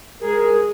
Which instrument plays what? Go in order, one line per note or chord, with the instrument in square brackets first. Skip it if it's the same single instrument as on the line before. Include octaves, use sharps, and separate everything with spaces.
[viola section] G#3 G#4 [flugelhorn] A#4